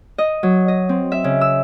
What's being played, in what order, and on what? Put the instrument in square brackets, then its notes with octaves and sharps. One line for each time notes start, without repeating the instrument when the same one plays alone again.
[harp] D#5
F#3
D#5
C4
E5
C#3
E6